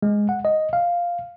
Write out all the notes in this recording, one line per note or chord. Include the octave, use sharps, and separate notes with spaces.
G#3
F#5
D#5
F5